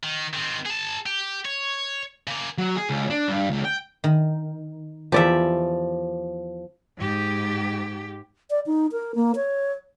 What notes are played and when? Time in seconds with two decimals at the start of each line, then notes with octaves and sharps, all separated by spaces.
0.04 D#3
0.34 D#3 C4
0.66 G#4 A5
1.06 G4
1.45 C#5
2.27 C#3 A#3
2.58 F#3
2.75 G#4
2.90 C#2
3.10 D4
3.28 G2
3.50 C#2
3.65 G5
4.04 D#3
5.12 E2 F3 G4 D5 E5
6.96 G#2 G4
8.50 D5
8.66 D#4
8.92 A#4
9.15 A#3
9.36 C#5